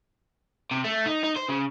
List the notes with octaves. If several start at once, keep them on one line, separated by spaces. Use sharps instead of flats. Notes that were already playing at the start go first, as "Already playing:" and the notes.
C3
A3
D#4
D#4
C5
C#3